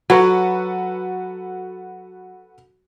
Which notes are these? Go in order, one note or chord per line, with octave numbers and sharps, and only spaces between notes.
F#3 F#4 A4 B4